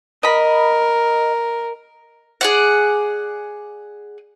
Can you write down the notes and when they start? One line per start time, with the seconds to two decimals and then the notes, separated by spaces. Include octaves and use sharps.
0.23 A#4 D#5 B5
2.41 G#4 D5 F#5